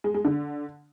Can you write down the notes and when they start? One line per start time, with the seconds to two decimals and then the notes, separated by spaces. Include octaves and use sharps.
0.04 G#3
0.14 G#3
0.25 D3